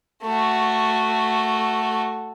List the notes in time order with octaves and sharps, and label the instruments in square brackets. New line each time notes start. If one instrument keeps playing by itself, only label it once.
[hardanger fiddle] A3 F#4